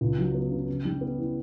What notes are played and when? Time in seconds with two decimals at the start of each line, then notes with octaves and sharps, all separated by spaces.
0.01 C#2
0.18 F#3
0.34 B3
0.51 C#3
0.68 C#3
0.85 G3
1.01 B3
1.18 E3